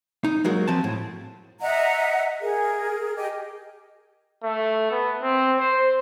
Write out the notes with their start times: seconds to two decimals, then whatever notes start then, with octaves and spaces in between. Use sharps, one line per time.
0.24 D#4
0.45 F#3 G#3 A#3 F#4
0.68 F3 C4 A5
0.84 A2
1.61 D#5 E5 F#5 A#5
2.41 G#4 A#4
3.16 G4 D#5
4.43 A3
4.92 B3
5.22 C4
5.59 C5